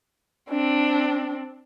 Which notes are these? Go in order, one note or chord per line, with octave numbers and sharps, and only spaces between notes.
C4 D4